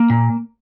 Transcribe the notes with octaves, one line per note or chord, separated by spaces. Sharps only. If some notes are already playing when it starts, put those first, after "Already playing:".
Already playing: A#3
A#2